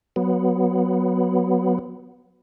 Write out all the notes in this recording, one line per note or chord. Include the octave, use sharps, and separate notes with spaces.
F#3 B3